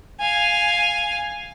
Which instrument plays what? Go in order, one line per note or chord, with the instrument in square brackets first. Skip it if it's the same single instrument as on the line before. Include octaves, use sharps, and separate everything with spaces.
[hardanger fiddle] F5 G#5